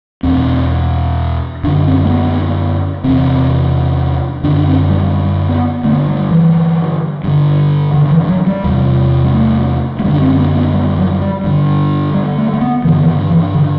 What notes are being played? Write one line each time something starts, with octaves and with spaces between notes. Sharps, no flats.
E2 B2 C4
F#2 D3 D4
C4
A3
B3
E2 C3 C4
F#2 D3 D4
D4
C4
G3
B3
G2 D3 A3
G3
E3
G2 D3
D3
E3
F#3
G3
E2 C3
G3
A3
A3
F#2 D3 G3
D4
C4
C4
B3
B3
G3
F#3
G3
G2 D3
G3
A3
A3
B3
G2 D3 E3
E3
D3
E3
D3